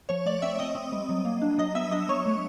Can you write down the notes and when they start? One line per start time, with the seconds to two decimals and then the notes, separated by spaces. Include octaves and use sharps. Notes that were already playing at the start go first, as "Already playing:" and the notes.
0.09 F3 C#5 C#6
0.26 A3 D5 D6
0.42 C4 E5 E6
0.59 C4 D#5 D#6
0.75 C4
0.92 G3
1.09 F#3
1.25 A#3
1.42 D4
1.58 F#3 D#5 D#6
1.75 B3 E5 E6
1.91 D4 D#5 D#6
2.09 F#3 C#5 C#6
2.26 A3